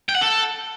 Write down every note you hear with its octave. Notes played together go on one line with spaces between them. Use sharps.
G5
F#5
A4